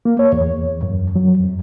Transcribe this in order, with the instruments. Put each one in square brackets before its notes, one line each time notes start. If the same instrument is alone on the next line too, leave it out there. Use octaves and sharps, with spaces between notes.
[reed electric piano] A#3
C#5
E2
F#2
F#3
F2